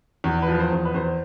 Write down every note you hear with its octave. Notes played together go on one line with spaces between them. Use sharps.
E2
B4
F3
C5
E2
B4
E2 C5